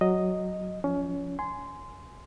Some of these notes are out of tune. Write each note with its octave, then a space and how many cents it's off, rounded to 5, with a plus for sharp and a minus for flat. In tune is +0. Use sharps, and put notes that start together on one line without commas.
F#3 +0 D#5 +0
F3 +0 C#4 +25
G#5 +10 C6 -15